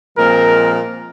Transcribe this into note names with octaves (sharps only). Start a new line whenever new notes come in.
A#2 F3 G#3 C4 A#4